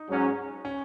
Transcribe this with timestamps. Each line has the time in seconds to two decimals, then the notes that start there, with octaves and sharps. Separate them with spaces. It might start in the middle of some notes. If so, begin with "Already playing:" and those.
Already playing: D#4
0.08 G#2 F#3 C#4
0.65 C#4